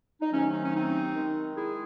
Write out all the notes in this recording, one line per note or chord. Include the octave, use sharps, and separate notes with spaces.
D#4
C3 D#3 F#3 A3 C#4
D#4
C#4
C4 D#4
D#3 G#3
E4 G#4